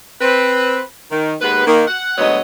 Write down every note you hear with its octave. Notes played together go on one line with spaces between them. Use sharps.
C4 B4
D#3
D#2 G#3 B3 B4
D#3 A#3
F#5
D2 F#3 G#3 B3 C#5 D#5